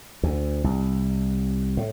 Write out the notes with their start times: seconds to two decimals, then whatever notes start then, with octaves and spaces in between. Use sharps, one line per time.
0.23 D2
0.64 C2
1.77 A2